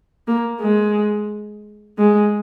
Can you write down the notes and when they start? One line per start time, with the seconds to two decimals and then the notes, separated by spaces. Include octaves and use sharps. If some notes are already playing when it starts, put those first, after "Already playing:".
0.28 A#3
0.62 G#3
1.98 G#3